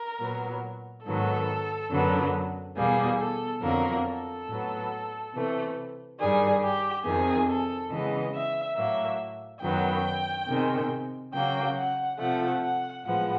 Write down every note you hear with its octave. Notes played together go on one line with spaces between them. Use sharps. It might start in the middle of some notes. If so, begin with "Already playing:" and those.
Already playing: A#4
A#2 F#3 B3
G#2 D#3 F#3 B3 A4
F#2 D3 F#3 B3
E2 B2 G3 A#3 G#4
A4
F2 D3 F#3 A#3 A#4
A4
A2 F#3 B3
C3 E3 A3
G2 D#3 G3 G#4
G4
F2 C3 D#3 G#4
A4
C#3 E3 G#3 B3 D#5
E5
A2 F#3 A#3 E5
F#2 D#3 F#3 B3 G5
C3 D#3 G#3
C#3 F#3 A#3 G5
F#5
C3 F3 A3 F#5
F#5
A2 F3 G#3 B3 F#5